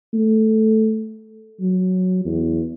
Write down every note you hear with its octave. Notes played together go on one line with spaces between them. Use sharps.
A3
F#3
E2